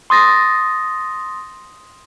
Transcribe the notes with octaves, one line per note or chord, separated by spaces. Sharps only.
C6 D#6 A6 A#6